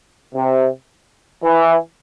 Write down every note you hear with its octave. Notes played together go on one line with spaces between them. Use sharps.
C3
E3